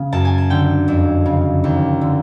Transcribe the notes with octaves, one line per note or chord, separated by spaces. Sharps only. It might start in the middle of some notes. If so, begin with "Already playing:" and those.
Already playing: C#3
F#2 A5
G#5
A5
D3 G5
F2
C#3
D#2
D3